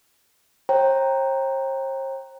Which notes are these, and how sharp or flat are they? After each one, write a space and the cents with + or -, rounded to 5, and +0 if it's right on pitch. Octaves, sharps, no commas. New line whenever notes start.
C5 +45 G5 +5 A#5 +0